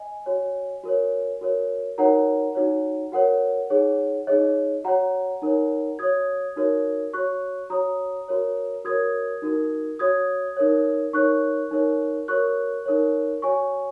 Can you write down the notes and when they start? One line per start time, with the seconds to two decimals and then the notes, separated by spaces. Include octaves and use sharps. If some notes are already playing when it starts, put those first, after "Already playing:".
Already playing: D#5 G#5
0.26 F#4 C#5
0.84 F#4 A#4 C#5
1.41 F#4 A#4 C#5
1.98 D#4 F#4 A#4 C#5 F#5 A#5
2.55 D#4 F#4 C#5
3.12 F#4 A#4 C#5 F#5
3.70 D#4 G#4 C#5
4.27 D#4 G#4 C#5 D#5
4.84 F#4 C#5 F#5 A#5
5.42 D#4 A#4 C#5
5.99 F#4 C#5 D#6 G#6
6.56 D#4 F#4 A#4 C#5
7.13 F#4 C#5 C#6 F#6
7.70 F#4 C#5 A#5 D#6
8.28 F#4 A#4 C#5
8.85 F#4 A#4 C#5 D#6 G#6
9.42 D#4 F#4 A#4
9.99 F#4 C#5 D#6 G#6
10.57 D#4 A#4 C#5
11.13 D#4 A#4 C#5 C#6 F#6
11.71 D#4 A#4 C#5
12.28 F#4 A#4 C#5 C#6 F#6
12.86 D#4 A#4 C#5
13.42 F#4 C#5 G#5 C#6